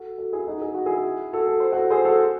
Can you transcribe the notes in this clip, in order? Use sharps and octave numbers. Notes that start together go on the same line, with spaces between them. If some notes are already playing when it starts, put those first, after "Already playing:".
Already playing: F#4 A4
F#4 A4
E4 G#4
D#4 F#4
G#4
F#4
E4 G#4
F#4 A4
A4
C5
F#4 A4
A4
G#4 C5
F#4 A4